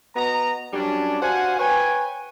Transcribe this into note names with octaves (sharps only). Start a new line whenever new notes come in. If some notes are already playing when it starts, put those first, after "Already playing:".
B3 F#4 D#5 A#5
F#2 G3 C#4 D4
F#4 C5 F5 F#5 G#5
B4 C#5 G5 G#5